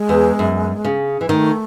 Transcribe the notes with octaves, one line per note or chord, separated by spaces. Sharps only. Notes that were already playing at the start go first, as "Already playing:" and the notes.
Already playing: G#3
E2
F#2
C#3
E3
D#3 A3